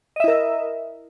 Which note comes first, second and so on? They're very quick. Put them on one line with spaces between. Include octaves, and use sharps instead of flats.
D#5 E5 E4 A#4